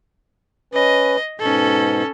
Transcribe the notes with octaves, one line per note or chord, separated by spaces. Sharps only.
C#4 B4 D#5
G#2 B2 C#4 A4